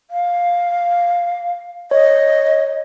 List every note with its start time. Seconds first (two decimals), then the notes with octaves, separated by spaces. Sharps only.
0.11 F5
1.91 C#5 D#5